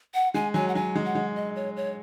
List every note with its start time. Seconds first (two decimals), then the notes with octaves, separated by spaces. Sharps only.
0.14 F#5
0.34 G#3 G#5
0.54 F#3 G#5
0.68 F#5
0.75 F#3 G#5
0.95 G#3
1.05 F#5
1.15 G#3
1.36 D#5
1.56 C#5
1.77 C#5